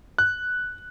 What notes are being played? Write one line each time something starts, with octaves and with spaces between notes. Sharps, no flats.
F#6